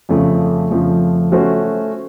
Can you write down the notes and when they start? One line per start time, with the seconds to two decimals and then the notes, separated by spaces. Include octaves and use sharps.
0.09 F2 C#3 F3 A3
0.71 F2 C#3 F3 A3
1.32 A3 C#4 F#4 C5